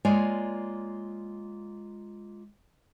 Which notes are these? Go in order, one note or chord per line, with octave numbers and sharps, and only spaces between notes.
G#3 A#3 F4 C#5 D5 G#5